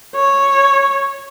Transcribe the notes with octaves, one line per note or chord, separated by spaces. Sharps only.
C#5